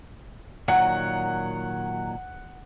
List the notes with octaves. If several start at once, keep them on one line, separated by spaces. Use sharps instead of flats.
A#2 D#3 F#3 F#5